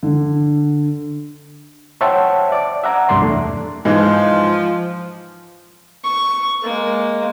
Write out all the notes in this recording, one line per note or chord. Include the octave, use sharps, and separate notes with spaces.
D3
C5 C#5 E5 F#5 G5 A5
D5 D6
E5 F#5 A#5
C2 G2 A#3 D5 C6
E2 A3 D4
G#2 E3 F3 G#3
C#6
G#3 A#3